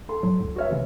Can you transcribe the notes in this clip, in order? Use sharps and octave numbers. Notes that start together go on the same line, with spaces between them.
A4 C6
A2 F#3
C#2 A2
F#4 B4 C#5 E5 F6
C3 E3 G#3